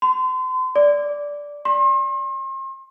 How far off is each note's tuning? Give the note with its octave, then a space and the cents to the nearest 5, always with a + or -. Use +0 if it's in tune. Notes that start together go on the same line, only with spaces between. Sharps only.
C6 -35
D5 -10
C6 +40